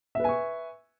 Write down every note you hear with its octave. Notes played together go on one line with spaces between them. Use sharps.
B4 E5 G#5 C#6